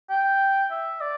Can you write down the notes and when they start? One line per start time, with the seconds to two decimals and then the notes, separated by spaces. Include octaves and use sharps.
0.10 G5
0.71 E5
1.01 D5